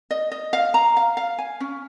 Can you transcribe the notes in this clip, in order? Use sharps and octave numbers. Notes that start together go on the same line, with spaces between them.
D#5
D#5
F5
A#5
F5
F5
G#5
C#4